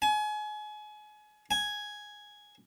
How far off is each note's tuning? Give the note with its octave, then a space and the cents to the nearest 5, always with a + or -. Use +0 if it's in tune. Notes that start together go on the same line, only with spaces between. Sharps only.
G#5 +30
G#5 +0